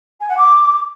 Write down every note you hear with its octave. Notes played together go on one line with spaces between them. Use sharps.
G#5
F#5
D6